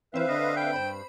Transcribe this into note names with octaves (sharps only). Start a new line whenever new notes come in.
E3 C4 B4 C5 E5 F5
D3 D#5
G5
G2 C5 B5